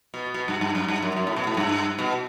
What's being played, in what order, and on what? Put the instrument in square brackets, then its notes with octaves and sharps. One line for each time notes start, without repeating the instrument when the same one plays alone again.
[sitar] B2
B2
G2
G2
F#2
G2
F#2
F#2
A2
B2
A2
G2
B2